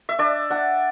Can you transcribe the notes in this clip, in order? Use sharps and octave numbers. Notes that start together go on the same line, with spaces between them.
E5
D4 D5
D4 F#5